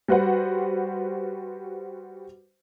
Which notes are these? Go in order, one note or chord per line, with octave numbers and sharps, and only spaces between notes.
G3 F#4 B4 C5 F#5